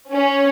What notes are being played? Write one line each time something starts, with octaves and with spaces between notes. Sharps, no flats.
C#4